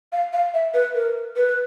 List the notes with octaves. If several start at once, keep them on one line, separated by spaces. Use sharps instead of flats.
F5
F5
E5
B4
A#4
B4